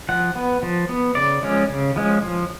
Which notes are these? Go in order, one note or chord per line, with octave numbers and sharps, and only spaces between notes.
F3 F#5
B3
F3
B3
C#3 D5
F3 G#3 C#4
C#3
F3 G#3 C#4
F3